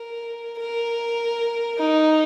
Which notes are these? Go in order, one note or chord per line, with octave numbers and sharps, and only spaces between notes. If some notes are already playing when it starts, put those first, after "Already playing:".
Already playing: A#4
A#4
D#4